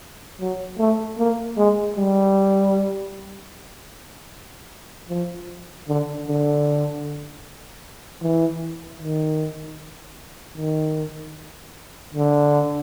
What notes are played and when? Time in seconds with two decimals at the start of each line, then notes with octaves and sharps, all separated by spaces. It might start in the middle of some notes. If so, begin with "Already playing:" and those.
0.41 F#3
0.79 A3
1.18 A#3
1.57 G#3
1.97 G3
5.09 F3
5.88 D3
6.28 D3
8.23 E3
9.01 D#3
10.57 D#3
12.14 D3